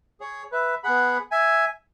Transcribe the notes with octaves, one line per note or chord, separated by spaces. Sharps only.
G#4 C#5
B4 E5
B3 G#4 F#5 B5
E5 G#5